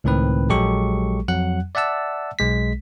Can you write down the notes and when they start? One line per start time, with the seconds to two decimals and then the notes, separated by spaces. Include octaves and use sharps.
0.04 C#2 A2 D#3 C4 B4
0.49 A#1 F#3 G#3 G4 A4 C#6
1.28 F2 F#3 F#5 F#6
1.75 D5 E5 F#5 A5 E6
2.39 B1 G#3 B6